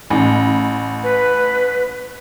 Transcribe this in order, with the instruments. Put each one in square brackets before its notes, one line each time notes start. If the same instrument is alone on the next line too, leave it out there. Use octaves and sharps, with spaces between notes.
[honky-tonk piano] A1
[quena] B4